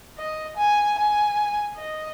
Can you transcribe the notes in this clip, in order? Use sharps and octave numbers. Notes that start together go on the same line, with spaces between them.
D#5
G#5
G#5
D#5